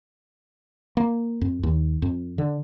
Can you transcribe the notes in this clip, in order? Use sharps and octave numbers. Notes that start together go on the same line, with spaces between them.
A#3
F2
D#2
F2
D3